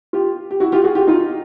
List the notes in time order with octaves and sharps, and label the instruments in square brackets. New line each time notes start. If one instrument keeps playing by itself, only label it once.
[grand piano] F4 G4
G4
E4 F#4
F4 G4
F#4 G#4
F4 G4
D#4 F4